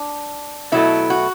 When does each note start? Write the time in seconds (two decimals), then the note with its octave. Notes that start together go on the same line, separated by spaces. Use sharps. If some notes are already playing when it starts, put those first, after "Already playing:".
Already playing: D4
0.72 B2 F#3 A3 E4
1.10 F#4